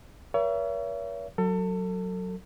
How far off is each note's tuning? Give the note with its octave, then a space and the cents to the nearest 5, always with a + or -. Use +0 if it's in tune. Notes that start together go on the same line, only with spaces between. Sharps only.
A#4 +40 C#5 +35 E5 +40
F#3 +0 A4 +30